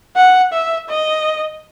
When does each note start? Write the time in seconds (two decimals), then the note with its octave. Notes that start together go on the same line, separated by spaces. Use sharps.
0.16 F#5
0.53 E5
0.89 D#5